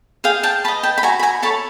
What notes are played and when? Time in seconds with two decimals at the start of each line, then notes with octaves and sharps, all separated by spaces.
0.24 G#4 F5 G5
0.43 G5 A5
0.64 B4 A5 B5
0.68 D#5
0.83 G5 A5
0.98 B5
1.03 F#4 G#5 A#5
1.19 B5
1.23 G#5 A#5
1.42 A4 C#5 A5 B5